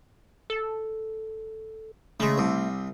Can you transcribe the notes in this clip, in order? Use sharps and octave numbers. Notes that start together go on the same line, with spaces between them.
A4
C#3 G#3 A3
C2 C3